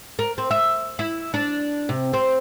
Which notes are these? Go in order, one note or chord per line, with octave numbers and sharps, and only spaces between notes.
A#4
C4
E5
E4
D4
C3
C4